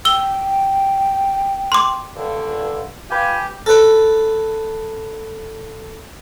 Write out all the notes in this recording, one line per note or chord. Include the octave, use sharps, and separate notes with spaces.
G5 E6 G7
C6 D6
C#2 G2 D3
F4 G4 B4 G#5
A4 B4